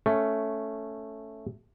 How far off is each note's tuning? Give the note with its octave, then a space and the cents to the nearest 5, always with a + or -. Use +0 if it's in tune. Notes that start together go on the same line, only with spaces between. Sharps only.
A3 +0 C#4 +0